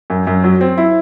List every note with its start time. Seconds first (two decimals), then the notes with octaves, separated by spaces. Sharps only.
0.10 F#2
0.27 F#2
0.44 F#3
0.61 C4
0.78 E4